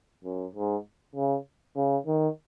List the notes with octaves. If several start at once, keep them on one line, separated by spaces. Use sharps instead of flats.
F#2
G#2
C#3
C#3
D#3